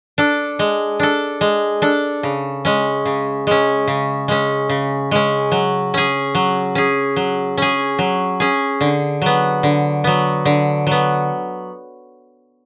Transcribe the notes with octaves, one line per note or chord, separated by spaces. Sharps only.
D4 A4
G#3
D4 A4
G#3
D4 A4
C#3
G#3 C#4
C#3
G#3 C#4
C#3
G#3 C#4
C#3
G#3 C#4
F#3
C#4 G#4
F#3
C#4 G#4
F#3
C#4 G#4
F#3
C#4 G#4
D3
F#3 B3
D3
F#3 B3
D3
F#3 B3